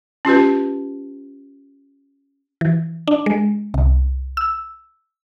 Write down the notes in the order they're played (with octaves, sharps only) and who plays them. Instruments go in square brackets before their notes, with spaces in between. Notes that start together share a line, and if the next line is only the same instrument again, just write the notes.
[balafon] C#4 F4 G4 B4
[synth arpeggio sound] E3
D4
G#3
C2
E6